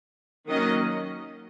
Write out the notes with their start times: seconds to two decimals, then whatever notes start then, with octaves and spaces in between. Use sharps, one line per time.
0.49 D#3 F#3 A#3 C#4 D#5